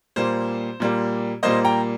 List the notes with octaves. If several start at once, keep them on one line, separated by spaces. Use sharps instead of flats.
A#2 G3 A#3 C5
A#2 G3 A#3
A#2 G3 A#3 C5 D#5
G5 A#5